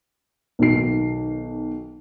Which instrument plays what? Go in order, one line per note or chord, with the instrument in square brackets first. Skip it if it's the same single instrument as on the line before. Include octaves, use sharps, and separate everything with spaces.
[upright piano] B1 D#3 F#4 C7